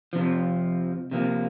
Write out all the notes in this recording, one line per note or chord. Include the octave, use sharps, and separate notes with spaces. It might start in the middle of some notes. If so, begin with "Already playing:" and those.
F2 C3 F3
C3 F3 A#3